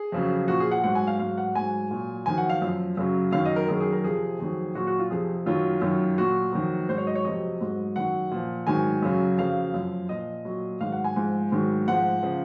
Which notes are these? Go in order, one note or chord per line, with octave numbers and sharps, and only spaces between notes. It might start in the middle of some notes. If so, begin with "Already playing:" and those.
Already playing: G#4
F2 C#3 F#3
A#2 F3 F#4
G#4
F#5
G#2 F#3 F#5
G#5
F5
G#2 F#3 F5
F#5
G#2 F#3 G#5
A#2 F#3
F2 D#3 F#3 G#5
F#5
F5
F#2 F3
F#2 C#3 F#3
F#2 D#3 F#3 F5
D#5
A#4
F#2 D#3 F#3 G#4
G#4
A#4
F2 C3 F3 G#4
F2 D#3 F#3
A#2 F#3 F#4
F#4
F4
F2 C3 F3 G#4
F#2 D#3 F#3 F4
F#2 D#3 F#3
A#2 F#3 F#4
F2 D#3 F#3
G#2 F#3 C5
C#5
D#5
C#5
F2 C3 F#3 D#5
G#2 F#3
F#2 D#3 F#3 F#5
A#2 F3
G#2 D#3 F#3 G#5
F#2 C#3 F#3
F2 C#3 F#3 F5
F#2 F3
A#2 F3 D#5
A#2 F#3
G#2 D#3 F#3 F5
F#5
G#5
G#2 F3
G#2 D#3 F#3
G#2 F3 F#5
C#3 F3